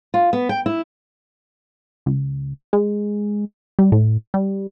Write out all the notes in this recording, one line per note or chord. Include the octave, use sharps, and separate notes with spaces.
F4
B3
G5
E4
C#2
G#3
G3
A2
G3